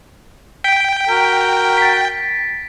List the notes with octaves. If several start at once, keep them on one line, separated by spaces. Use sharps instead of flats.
G5 B6 D7
F#4 A#4
A6 B6